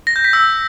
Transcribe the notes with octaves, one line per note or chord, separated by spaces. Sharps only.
A#6
G6
B6
E6